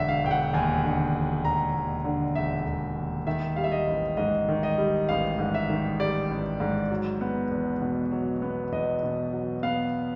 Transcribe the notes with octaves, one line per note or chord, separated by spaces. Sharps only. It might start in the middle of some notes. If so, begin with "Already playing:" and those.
Already playing: E1 D3 E5
F5
E1 G5
F#5
D#2 G#5
D3
E1
E1 A#5
D#2
D3
E1 E5
E1
D#2
D#3 E5
G3 F5
E5
D#5
A1
G#2 D#5
D#3
D#5
G3
A1 F5
G#2
E5
D#3
G3 D5
A1
G#2
F#3
B3
E2
B2
F#3
B3
E2 D#5
B2
F#3
B3 F5